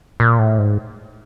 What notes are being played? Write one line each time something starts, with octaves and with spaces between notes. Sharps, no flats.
A#2
A2
G#2